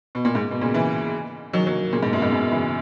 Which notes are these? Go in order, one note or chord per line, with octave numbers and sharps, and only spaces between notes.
B2
A#2
G#2
B2
A#2 C#3
C#3 E3
D#3 F#3
F#3 A#3
A#2 C#3
G#2 B2
F#2 A#2
G#2
G#2 B2
C#3 E3